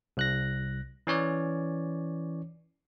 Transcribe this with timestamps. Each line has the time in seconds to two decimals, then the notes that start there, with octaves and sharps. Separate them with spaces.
0.17 C2 F#6 A#6
1.07 E3 C#4 C#5 D5